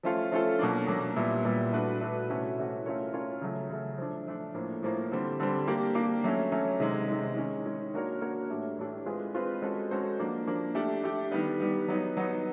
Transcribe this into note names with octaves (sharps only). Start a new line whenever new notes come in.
F3 A3 C#4 F4 A4
F3 A3 C#4 F4 A4
B2 F#3 A#3 D4
B2 F#3 A#3 D4
A#2 G3 B3 E4
A#2 G3 B3 E4
A3 D4 F#4 B4
A3 D4 F#4 B4
C3 E3 A3 C#4 F#4
C3 E3 A3 C#4 F#4
A3 C#4 F4 A#4 C#5
A3 C#4 F4 A#4 C#5
C#3 F#3 A3
C#3 F#3 A3
F3 A3 D4
F3 A3 D4
A2 F3 A#3
A2 F3 A#3
D3 G3 C4
D3 G3 C4
A#3 D4 G4
A#3 D4 G4
F#3 A3 C#4
F#3 A3 C#4
C3 D#3 G#3
C3 D#3 G#3
D#3 G#3 C#4
D#3 G#3 C#4
A#3 D4 F#4 A#4 C#5
A#3 D4 F#4 A#4 C#5
A2 E3 A3 D4 G4
A2 E3 A3 D4 G4
G#3 C4 F4 G#4 B4
G#3 C4 F4 G#4 B4
G#3 C#4 F#4 A4 C5
G#3 C#4 F#4 A4 C5
F3 A#3 D4
F3 A#3 D4
A3 D4 G4
A3 D4 G4
D#3 G3 B3
D#3 G3 B3
F#3 B3 D#4
F#3 B3 D#4